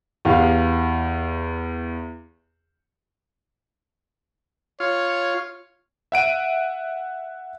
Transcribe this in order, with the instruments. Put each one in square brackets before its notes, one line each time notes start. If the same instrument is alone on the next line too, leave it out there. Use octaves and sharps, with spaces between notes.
[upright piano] E2 G4 F5
[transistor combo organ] F4 [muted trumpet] C#5
[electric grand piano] E5 F#5 D7 D#7